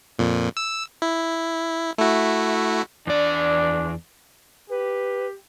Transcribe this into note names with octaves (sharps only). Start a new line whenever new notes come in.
F2 A#2
E6
E4
A3 E4 F#4
E2 D4 D5
G4 B4